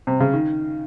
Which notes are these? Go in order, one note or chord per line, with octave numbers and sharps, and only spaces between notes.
C3
C#3
D#3